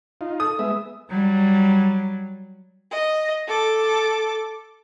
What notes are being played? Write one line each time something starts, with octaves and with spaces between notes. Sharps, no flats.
D#4 F4
A4 D#6
G#3 B3 E5
F#3 G3
D#5
A4 D6